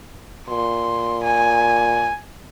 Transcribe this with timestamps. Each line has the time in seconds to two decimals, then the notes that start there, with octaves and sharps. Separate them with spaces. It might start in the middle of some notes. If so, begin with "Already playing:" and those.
0.49 A#2 C6
1.23 G#5